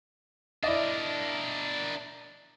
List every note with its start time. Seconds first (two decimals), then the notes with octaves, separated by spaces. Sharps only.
0.63 D4 E4 A#4 D5 D#5